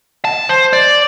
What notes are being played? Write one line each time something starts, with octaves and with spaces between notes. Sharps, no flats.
A5
C5
D5